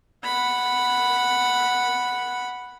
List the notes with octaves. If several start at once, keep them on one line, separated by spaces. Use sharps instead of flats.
F#5 B5